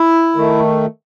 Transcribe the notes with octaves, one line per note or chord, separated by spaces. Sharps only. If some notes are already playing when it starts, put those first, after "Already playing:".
Already playing: E4
D#3 A3